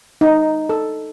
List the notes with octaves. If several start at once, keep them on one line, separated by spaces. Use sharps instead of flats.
D#4
A4